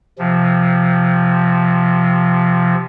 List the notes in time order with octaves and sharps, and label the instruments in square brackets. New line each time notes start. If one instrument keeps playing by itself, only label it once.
[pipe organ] C3 F3